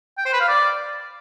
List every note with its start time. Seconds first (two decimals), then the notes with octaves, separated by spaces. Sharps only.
0.18 G5
0.25 C5
0.33 B4
0.40 F5
0.48 D5